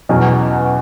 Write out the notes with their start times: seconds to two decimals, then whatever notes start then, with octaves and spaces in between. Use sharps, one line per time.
0.09 E2 B2 F#3 C#4